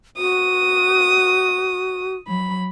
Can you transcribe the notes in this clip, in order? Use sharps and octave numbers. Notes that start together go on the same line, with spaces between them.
F#4 D#6
F#3 B5